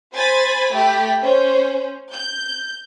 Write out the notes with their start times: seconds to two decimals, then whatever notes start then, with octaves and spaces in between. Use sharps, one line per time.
0.12 C5 G#5 B5 A6
0.71 A3 G4 B5
1.22 C#4 C5
2.11 G6